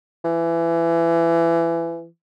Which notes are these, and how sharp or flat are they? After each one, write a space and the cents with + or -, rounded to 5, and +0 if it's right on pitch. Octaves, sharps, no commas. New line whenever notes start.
E3 +25